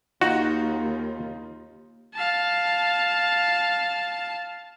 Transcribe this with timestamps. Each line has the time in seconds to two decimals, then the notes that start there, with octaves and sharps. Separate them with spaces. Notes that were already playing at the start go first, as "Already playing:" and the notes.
0.21 D#2 D#4 F4 F#4
2.14 F5 A5